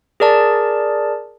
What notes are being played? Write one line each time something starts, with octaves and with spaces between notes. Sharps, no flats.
G#4 A#4 D5 A5